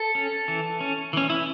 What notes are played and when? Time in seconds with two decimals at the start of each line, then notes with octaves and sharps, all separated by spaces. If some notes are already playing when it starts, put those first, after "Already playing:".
Already playing: A4
0.15 C#4
0.48 E3
0.81 C#4
1.13 E3 C#4
1.30 E4